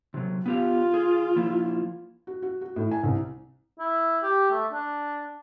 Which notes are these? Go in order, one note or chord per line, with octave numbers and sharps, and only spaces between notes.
C3 F#3
B3 F4 G4 F5
G#4
F3 A#3 E4
F#4
F#4
F#4
A2
G#5
C2
E4
G4
A3
D4